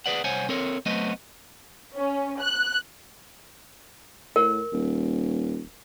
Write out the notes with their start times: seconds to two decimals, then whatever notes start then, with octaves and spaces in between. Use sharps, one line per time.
0.06 G#4 A4 B4 D5 F#5
0.24 C2 C5 C#5 F#5 G#5
0.49 C4 A4 A#4 C#5
0.86 F#3 A3 B3 C4 B4 D#5
1.96 C#4
2.41 F#6
4.36 A2 A#4
4.72 D#1